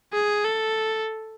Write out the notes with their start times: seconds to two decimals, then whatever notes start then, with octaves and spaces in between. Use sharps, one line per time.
0.13 G#4
0.44 A4